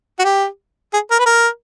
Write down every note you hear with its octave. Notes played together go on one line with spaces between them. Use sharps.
F#4
G4
G#4
A#4
B4
A#4